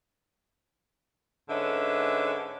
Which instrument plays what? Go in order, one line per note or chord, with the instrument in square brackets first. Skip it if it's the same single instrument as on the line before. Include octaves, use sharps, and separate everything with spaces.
[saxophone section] G#2 D3 C#4 B4 D#5 E5